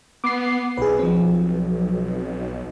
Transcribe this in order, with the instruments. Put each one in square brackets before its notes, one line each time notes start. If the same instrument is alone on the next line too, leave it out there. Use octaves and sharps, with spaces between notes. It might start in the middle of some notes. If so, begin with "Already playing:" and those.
[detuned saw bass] B3 [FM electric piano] D6 C7
[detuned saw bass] B1 [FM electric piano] G#4 B4
[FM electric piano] F3 C4